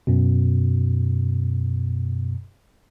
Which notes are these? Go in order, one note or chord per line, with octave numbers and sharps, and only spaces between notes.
F#2 B2